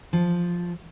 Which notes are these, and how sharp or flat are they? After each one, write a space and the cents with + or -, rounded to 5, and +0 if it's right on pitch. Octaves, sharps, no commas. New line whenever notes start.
F3 +0